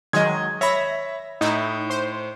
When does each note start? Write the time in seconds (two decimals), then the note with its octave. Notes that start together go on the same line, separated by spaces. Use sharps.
0.13 D#3 F#3 G#3 D#5 G#6
0.61 C#5 E5 B5 A#6
1.41 A2 D#4 E4
1.90 C5